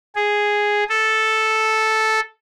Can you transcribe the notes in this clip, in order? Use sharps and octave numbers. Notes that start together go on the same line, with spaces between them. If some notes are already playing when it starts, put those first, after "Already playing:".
G#4
A4